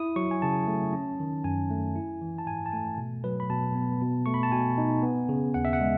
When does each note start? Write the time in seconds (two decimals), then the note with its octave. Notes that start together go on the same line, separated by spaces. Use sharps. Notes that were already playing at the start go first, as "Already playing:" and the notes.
Already playing: E4 D#6
0.16 F#3 C#6
0.31 G#5
0.42 C#3 A5
0.67 A3
0.93 C#4
1.20 D#3
1.44 F#2 G#5
1.71 A3
1.96 E4
2.21 E3
2.39 A5
2.47 G#2 G#5
2.66 A5
2.72 A3 G#5
2.98 B2
3.24 F#3 B4
3.40 B5
3.49 B2 A5
3.75 B3
4.01 B2
4.26 A3 C#6
4.34 B5
4.43 A5
4.52 B2 G#5
4.78 D#4
5.03 B3
5.29 C#3
5.54 D#2 F#5
5.65 E5
5.73 F#5
5.81 G#3